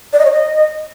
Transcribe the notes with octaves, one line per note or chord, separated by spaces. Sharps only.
D5
D#5
C#5
D#5